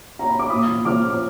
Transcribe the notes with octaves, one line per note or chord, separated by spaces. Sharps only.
A#5
B5
D6
A#2 B5 D#6
F3
F3 D6 F6
A#2
D6